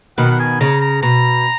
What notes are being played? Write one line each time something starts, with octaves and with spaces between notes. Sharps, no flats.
B2 D#3 F#5
F#5
G#5
C#3 A#5
A#5
B2 A#5